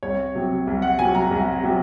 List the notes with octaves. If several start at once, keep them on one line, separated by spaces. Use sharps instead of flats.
C2 C#5
C3 F#3
C2
F#5
C3 F#3 G#5
A#5
C2
C3 F#3